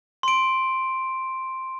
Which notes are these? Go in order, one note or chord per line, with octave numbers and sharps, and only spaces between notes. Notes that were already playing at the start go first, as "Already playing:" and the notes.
C6 D7